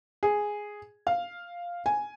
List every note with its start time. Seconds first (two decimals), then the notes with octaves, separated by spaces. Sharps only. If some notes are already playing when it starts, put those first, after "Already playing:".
0.23 G#4
1.07 F5
1.86 G#5